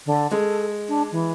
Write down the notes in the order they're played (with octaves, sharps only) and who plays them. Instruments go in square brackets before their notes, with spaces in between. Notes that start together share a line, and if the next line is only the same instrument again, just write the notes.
[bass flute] D3
[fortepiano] G#3 [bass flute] A4
[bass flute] D4
E3